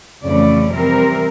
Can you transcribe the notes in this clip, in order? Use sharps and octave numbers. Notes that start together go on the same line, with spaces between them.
F2 C#3 E3 A3 C#4 D5
C3 E3 G3 C4 A#4